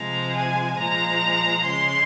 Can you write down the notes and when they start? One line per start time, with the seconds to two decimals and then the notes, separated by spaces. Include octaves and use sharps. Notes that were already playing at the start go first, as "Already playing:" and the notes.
Already playing: C3 F3 G#3 A#5
0.35 G#5
0.78 A#2 F3 G#3 A#5
1.66 C#3 G#3 C6